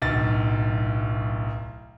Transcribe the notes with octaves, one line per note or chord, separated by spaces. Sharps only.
D1 B1 A6